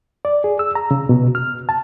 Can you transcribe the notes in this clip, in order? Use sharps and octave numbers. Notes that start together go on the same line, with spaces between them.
D5
G#4
E6
A#5
C#3
B2
F6
A5